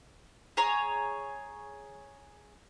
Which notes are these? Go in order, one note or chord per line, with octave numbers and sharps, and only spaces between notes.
G#4 C#5 A#5